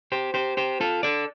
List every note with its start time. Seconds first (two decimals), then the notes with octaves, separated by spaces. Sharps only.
0.12 G4 C5
0.34 G4 C5
0.57 G4 C5
0.81 F4 A4
1.03 A4 D5